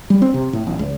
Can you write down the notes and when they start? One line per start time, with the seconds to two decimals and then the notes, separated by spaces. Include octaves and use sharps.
0.10 G3
0.22 C4
0.34 C3
0.53 A2
0.67 A1
0.79 C#2